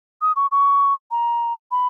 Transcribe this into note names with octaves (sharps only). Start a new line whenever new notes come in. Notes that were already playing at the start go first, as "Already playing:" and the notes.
D#6
C#6
C#6
A#5
B5